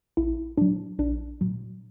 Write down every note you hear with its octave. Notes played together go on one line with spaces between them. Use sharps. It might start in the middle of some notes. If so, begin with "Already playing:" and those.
A#1 E4
A#2 F#3 D4
A#1 D4
A#2 F#3